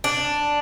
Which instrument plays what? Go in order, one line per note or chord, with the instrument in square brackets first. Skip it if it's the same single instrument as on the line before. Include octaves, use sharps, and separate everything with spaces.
[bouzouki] D4